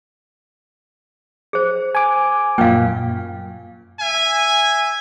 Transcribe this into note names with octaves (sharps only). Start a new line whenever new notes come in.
G#4 C5
G#5 D6
F#2 A#2 F5 G5
E5 G#5